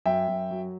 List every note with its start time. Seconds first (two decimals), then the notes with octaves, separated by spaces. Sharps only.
0.06 F#2 E5 G5
0.28 F#2
0.51 F#3